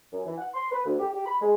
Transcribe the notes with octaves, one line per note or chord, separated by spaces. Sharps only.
F#2
E3
F#5
C6
B4
D2
G4
G4
B5
G#3